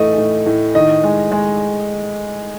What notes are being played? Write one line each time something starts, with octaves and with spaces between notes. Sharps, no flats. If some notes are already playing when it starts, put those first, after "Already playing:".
Already playing: A2 E3 A3 D#5
A2
A2
D#3 D#5
G#3
G#3